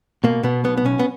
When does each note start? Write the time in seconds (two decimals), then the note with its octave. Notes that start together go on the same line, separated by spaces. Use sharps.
0.24 B2 A#3
0.43 B2 B3
0.64 B1 B3
0.77 B3
0.85 B1 C#4
0.99 B3